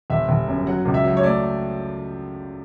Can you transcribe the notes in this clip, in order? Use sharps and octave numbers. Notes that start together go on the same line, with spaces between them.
G1 E5
G1
F#2
F#3 F#5
C#2
E5
F#3
C#5
A3 D5